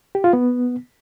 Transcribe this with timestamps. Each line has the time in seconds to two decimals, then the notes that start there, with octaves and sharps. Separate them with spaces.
0.15 G4
0.24 F4
0.33 B3